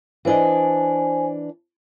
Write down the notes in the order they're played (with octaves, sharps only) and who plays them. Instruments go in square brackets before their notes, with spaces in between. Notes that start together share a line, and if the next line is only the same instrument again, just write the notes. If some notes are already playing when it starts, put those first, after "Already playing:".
[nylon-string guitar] E3 D4 D#5 [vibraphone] C5 G#5